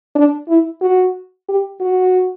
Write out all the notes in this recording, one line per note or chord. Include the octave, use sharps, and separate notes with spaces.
D4
E4
F#4
G4
F#4